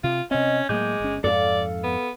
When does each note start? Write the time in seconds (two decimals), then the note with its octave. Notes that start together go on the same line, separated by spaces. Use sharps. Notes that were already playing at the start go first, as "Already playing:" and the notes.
0.04 C3 F4
0.31 C3 C4 C#4 D#5
0.69 A2 F#3 G#3 A#3 D6 G6
1.00 G1 C#4
1.24 F2 G#2 A4 D5 F5
1.84 B3